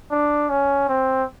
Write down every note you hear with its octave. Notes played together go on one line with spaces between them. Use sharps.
D4
C#4
C4